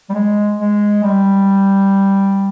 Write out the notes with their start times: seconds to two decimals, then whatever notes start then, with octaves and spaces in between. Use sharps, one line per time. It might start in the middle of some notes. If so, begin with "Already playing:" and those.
0.09 G3
0.14 G#3
0.59 G#3
1.03 G3